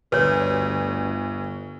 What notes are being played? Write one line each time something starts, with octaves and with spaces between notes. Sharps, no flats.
G1 D2 B4 C#5